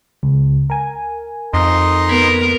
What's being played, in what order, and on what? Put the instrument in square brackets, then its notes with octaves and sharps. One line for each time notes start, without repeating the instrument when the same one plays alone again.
[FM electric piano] C#2
A#4 G#5
[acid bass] F2 [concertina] D#4 D#5 C6
[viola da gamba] B3 A#4 [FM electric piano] B5 G#6 B6